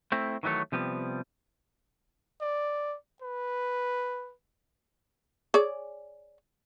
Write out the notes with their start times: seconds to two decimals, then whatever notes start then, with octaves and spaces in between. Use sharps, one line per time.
0.12 A3 C4 E4
0.43 D#3 E3 F#3 A3 C#5
0.72 C3 F3 G3 B3
2.41 D5
3.22 B4
5.54 G#4 C#5 D5